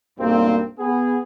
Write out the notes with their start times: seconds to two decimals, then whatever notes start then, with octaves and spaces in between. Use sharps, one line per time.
0.19 B1 G2 A#3 C4
0.79 B3 G#4